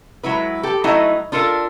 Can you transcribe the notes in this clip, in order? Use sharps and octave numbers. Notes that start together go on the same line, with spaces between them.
F#3 G#3 E4 B4
G4 A4
F#3 A3 D#4 E4 D#5
D4 F4 A4 A#4